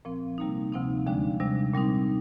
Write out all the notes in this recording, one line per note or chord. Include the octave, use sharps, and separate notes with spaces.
A#2 F3 C4
C3 G3 A#3 D#4
D2 C3 F3 C4 D#4
D#2 D3 F3 G#3 D4
C3 G3 D4
A#2 G3 C4 D#4